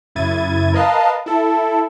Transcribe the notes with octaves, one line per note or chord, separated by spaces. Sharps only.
F#2 C#3 E4 G#6 A6 D#7
A#4 B4 D#5 F5 A5
E4 A4